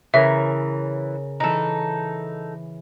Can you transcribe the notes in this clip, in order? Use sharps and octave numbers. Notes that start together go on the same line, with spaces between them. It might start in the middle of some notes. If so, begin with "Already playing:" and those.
C#3 E3 A#4 C#5 E5
E3 D#4 A4 F#6